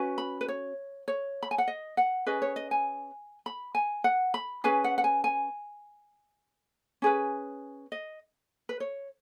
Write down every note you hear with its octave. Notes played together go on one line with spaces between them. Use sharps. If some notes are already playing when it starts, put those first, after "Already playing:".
Already playing: C#4 F#4 B4
B5
B4
C#5
C#5
B5
G#5
F#5
D#5
F#5
C#4 G#4 B4 D#5
C#5
D#5
G#5
B5
G#5
F#5
B5
C#4 G#4 B4 G#5
F#5
F#5
G#5
G#5
C#4 G#4 B4
D#5
B4
C#5